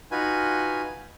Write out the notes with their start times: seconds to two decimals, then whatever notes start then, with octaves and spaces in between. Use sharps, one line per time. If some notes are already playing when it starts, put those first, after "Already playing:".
0.11 D#4 F4 F#4 B4 G#5